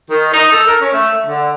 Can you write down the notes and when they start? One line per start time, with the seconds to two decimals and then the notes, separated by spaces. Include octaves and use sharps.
0.11 D#3
0.34 D#4
0.52 A4
0.67 A#4
0.81 C#4
0.93 A3
1.26 D3